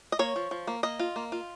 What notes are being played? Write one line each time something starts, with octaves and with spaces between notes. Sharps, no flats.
D#5
A#3 C#5
F3
F3
A#3
A#3 D#5
F4
A#3
F4